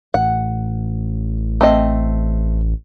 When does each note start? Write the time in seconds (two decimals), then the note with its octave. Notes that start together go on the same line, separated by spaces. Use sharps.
0.14 A1 F#5
1.61 A3 C4 D#5